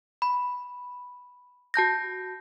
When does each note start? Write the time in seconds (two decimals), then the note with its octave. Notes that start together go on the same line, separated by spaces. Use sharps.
0.22 B5
1.74 F#4 A5 G6 A#6